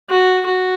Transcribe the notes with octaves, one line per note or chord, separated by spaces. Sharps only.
F#4
F#4